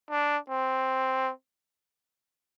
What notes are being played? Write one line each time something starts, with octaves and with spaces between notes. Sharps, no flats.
D4
C4